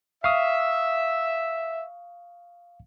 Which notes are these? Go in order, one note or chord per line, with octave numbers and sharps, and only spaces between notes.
E5 F5 C#6 D#6